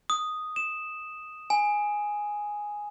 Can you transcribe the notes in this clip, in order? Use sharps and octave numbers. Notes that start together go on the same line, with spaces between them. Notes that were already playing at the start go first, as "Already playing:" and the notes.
D#6
E7
G#5